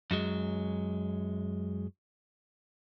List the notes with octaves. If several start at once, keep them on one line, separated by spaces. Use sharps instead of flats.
F#2 F#3 G#3